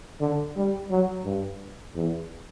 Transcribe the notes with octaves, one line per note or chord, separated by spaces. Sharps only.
D3
G3
F#3
G2
E2